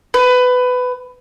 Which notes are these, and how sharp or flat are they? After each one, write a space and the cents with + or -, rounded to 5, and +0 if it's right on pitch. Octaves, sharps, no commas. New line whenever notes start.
B4 +20